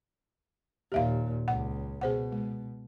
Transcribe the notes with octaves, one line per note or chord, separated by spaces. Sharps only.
D#2 A#2 G4 E5 F5
C#2 F#5
B2 G#4 C5 F#5
G#3